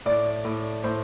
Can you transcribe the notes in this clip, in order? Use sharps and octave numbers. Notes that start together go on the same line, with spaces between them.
A2 D5
A2
A2 C5